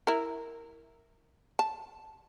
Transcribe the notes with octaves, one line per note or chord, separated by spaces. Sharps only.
E4 A#4
A5